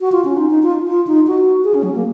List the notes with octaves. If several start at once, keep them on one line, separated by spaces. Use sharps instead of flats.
F#4
F4
C#4
D#4
D#4
F4
F4
D#4
F#4
G#4
C#4
F#3
A#3